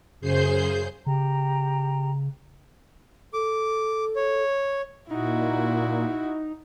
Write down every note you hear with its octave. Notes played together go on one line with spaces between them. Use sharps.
F#2 C#3 G#4 C5 G6 C7
C#3 G4 G5 A#5
A4 D6
C#5
A#2 D#4 E4 F#4